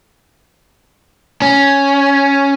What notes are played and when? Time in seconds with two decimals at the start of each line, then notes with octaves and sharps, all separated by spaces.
1.42 C#4